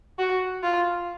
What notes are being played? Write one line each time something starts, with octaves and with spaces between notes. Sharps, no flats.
F#4
F4